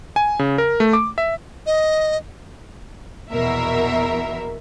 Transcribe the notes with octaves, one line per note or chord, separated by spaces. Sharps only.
G#5
C#3
A#4
A3
D6
E5
D#5
A#1 E2 B2 A#4 E5